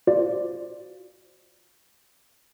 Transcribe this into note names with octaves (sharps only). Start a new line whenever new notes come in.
F4 F#4 C5 D5